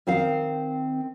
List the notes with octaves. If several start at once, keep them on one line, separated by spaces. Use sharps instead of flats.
D#3 C4 A#4 F5